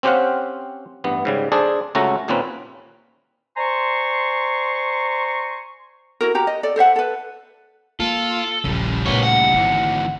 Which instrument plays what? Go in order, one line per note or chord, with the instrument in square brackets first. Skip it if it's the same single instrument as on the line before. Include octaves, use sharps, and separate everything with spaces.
[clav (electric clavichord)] C4 C#4 G4 C5 F5 F#5
A1 G2 B3
G#2 C#3 G3
D4 G#4 A4 C5 D5
C#2 A3 C#4 F#4 A4 A#5
D#2 A#2 A#3 C4 C#4 B4
[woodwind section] C5 D5 G#5 A#5 C6 C#6
[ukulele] E4 F#4 A#4
F#4 G4 A#5
D#5
A4 D5
A4 C5 E5 F#5
A4 B4
[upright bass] A#3 [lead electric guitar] F4 [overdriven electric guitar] A4
[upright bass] D#1 A#1 [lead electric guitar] C#3 G3
[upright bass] D2 A#2 [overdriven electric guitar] B3 C#5
[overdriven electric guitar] F#5
[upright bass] G#1 [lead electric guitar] D2 E3